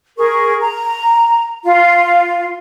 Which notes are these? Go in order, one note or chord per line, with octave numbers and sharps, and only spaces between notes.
G#4 A#4 C#6
A#5
F4